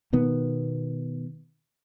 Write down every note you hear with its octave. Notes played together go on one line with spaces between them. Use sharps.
B2 D#3 B3